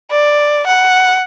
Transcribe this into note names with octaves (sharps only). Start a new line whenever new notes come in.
D5
F#5